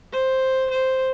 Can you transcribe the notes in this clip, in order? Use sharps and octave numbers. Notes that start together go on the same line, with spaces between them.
C5
C5